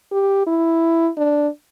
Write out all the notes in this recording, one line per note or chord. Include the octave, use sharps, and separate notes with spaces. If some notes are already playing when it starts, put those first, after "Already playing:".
G4
E4
D4